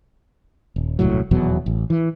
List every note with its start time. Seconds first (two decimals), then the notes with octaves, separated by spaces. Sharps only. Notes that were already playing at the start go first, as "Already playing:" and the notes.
0.76 D#1
0.99 D#1 C2 A2 F#3
1.31 D#1 E2 B2 F#3
1.66 A1
1.90 E3